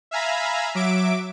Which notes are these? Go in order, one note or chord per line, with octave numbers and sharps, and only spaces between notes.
E5 F5 G#5 A#5 B5
F#3 E5 D6 D7